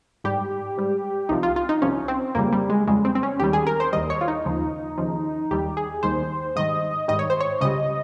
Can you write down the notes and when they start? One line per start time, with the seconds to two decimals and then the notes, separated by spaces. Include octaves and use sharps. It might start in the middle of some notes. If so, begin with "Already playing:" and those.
0.24 G#2 G3 G4
0.77 G#2 G3
1.29 C2 C3 F3 D#4
1.43 F4
1.56 F4
1.69 D#4
1.82 C2 C3 F3 C#4
2.08 C4
2.35 F2 C#3 G3 A#3
2.53 G3
2.69 G#3
2.87 F2 C#3 G3 G#3
3.05 C4
3.15 C4
3.23 C#4
3.40 D#2 D#3 G3 G4
3.53 G#4
3.67 A#4
3.80 C5
3.92 D#2 D#3 G3 D#5
4.10 C#5
4.21 F4
4.28 D#4
4.45 D#2 C#3 F3
4.98 D#2 C#3 F3
5.51 D#2 D#3 G3 G4
5.77 G#4
6.03 D#2 D#3 G3 C5
6.56 G#2 D#3 G3 D#5
7.08 G#2 D#3 G3 D#5
7.19 C#5
7.30 C5
7.40 C#5
7.61 C#2 C#3 G3 D#5